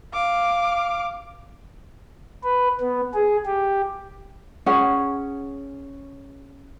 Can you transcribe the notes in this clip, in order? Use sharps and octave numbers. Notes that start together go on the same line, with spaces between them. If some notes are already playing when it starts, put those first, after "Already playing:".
F5 D6
B4
B3
G#4
G4
C#4 G#4 F#5